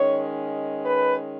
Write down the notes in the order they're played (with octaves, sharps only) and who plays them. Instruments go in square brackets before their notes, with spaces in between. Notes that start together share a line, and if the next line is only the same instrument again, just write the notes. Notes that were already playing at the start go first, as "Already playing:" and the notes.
Already playing: [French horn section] D#3 G#3 C#4 C#5
B4